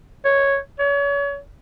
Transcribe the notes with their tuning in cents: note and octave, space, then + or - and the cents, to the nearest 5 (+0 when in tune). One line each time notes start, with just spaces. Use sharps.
C#5 -5
C#5 +35